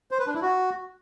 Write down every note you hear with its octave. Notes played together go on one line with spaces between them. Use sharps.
C5
B4
D4
E4
F#4